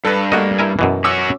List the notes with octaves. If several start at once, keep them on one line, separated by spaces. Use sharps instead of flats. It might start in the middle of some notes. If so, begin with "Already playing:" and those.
G2 A4 B4
A3 A#3 F#4 D#5
E4 A#4 G#5
F#2 B2 E3
C#4 F#4 D6 E6